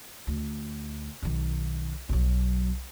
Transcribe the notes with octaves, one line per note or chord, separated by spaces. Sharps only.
D2
B1 D#3
B1 F#3